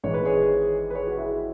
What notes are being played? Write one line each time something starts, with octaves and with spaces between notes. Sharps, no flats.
G#1 G#2 E3 C#5
B4
G#4 C#5
B4
G#4 C#5
F#4
E4 G#4